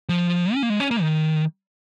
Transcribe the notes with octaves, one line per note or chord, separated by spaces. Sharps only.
F3
C#4
A#3
G#3
C#4
A#3
D#3